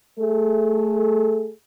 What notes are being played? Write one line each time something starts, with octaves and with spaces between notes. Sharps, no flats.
A3 G#4 A4